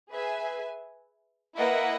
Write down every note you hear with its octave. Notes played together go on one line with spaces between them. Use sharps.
G#4 B4 E5 G#5
A#3 E4 B4 D#5 F#5